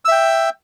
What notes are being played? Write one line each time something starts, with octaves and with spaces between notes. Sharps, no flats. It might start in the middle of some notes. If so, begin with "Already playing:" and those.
E5 G5 E6